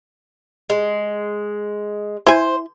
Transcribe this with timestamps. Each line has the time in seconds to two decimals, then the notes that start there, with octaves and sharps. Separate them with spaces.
0.70 G#3
2.27 E4 C5 G#5